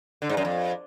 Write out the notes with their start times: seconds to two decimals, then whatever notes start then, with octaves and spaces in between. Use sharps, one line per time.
0.22 D3
0.29 G#2
0.37 F#2
0.45 F2